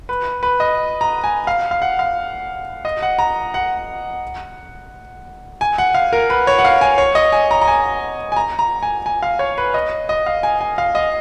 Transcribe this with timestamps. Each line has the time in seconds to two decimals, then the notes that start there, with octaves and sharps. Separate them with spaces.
0.09 B4
0.43 B4
0.60 D#5
1.01 A#5
1.24 G#5
1.47 F5
1.71 F5
1.82 F#5
1.99 F5
2.85 D#5
3.02 F#5
3.19 A#5
3.54 F#5
5.61 G#5
5.78 F#5
5.95 F5
6.13 A#4
6.30 B4
6.47 C#5
6.59 F#5
6.65 F5
6.81 G#5
6.98 C#5
7.15 D#5
7.32 G#5
7.51 A#5
7.61 A#5
7.68 G#5
8.32 G#5
8.36 A#5
8.59 A#5
8.83 G#5
9.06 G#5
9.23 F5
9.39 C#5
9.58 B4
9.74 D#5
10.09 D#5
10.26 F5
10.43 G#5
10.61 G#5
10.78 F5
10.95 D#5